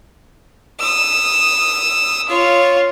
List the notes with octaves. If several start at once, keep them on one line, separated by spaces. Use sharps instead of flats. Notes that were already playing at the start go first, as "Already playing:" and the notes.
D#6 E6
F4 C#5